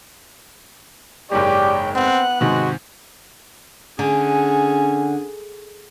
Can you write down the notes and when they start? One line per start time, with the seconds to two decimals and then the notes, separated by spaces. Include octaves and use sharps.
1.31 F#1 G#2 G#3 G4 C#5 D5 G5
1.95 B3 C4 F#5 F#6
2.41 G#2 C3 D#3 G#3 F#4
3.99 D3 C#4 G#4